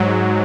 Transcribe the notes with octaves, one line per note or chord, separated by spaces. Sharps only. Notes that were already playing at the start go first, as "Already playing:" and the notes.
Already playing: G#2 F#3